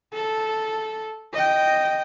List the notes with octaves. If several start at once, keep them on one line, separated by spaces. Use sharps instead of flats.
A4
D#5 G5